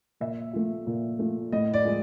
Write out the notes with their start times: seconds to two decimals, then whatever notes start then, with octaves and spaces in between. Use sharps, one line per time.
0.20 A#2 E5
0.53 F3 A3
0.87 A#2
1.19 F3 A3
1.52 A2 D#5
1.74 D5
1.85 F3 G#3